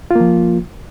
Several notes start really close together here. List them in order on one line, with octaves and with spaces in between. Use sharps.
F4 A#3 F3